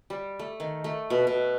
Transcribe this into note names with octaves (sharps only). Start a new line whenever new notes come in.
G3
A3
D#3
A3
B2
B2